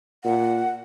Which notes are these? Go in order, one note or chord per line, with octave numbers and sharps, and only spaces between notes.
A#2 F#5